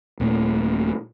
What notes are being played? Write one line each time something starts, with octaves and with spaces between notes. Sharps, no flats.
D#1 A#2 A3